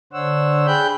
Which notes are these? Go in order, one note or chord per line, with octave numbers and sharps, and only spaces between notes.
D3 D4 C5 C#5 F#5 E6
G#4 G5 B5 F#6 G6